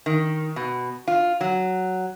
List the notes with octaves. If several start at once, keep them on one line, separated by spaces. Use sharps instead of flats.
D#3
B2
F4
F#3